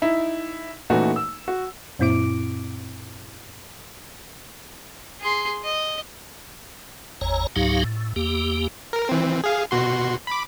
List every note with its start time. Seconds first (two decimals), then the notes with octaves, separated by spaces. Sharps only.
0.02 D#4 E4
0.90 A#2 E3 A3 C#4 D#4 F#4
1.16 E6
1.48 F#4
1.99 F#2 A#2 C4 E4 D6 D7
5.21 G#4 C6
5.64 D#5
7.21 G#1 E2 C#5 A#5
7.56 C#2 G#2 F#3 D#4 G4 F5
7.84 A2
8.16 E2 A#3 G4
8.93 A#4
9.09 E3 C4
9.44 G#4 F5
9.71 B2 F#4 C6
10.27 B5 D6